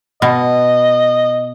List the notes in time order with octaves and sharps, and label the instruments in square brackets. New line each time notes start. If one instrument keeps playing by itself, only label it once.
[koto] B2 [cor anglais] D#5